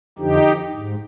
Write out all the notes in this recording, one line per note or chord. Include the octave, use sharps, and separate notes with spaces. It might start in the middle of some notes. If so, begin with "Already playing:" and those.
F2 D3 F3 D#4 G4
G#2